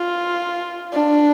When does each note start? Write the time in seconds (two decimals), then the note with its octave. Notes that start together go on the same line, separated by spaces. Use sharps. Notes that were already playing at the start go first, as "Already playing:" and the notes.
Already playing: F4
0.93 D4